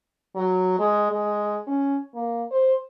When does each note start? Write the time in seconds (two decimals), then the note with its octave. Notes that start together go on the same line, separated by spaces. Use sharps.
0.36 F#3
0.79 G#3
1.12 G#3
1.67 C#4
2.15 A#3
2.51 C5